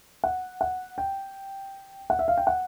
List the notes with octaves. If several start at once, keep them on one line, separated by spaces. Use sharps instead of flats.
F#5
F#5
G5
F#5
E5
F5
G5
F#5